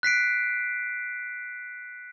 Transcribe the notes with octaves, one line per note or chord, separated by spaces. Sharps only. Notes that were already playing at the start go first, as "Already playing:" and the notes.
F#6 B6 C7 D7